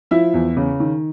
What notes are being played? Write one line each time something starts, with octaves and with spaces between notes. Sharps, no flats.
F3 E4 E5
E2
C#3
D#3